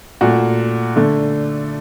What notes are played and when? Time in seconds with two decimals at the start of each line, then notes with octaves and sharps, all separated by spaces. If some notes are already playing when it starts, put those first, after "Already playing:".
0.21 A#2 A3 F#4
0.96 D3 A3